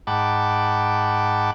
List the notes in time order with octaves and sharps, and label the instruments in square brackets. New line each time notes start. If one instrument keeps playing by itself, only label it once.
[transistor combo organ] G#2 F#5 G5 A5 B5 D6